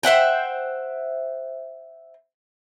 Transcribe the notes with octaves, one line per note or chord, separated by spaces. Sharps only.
C5 E5 F#5 G5